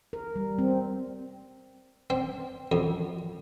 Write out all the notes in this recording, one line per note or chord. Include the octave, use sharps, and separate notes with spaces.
A#4
G3
C4
C4
F2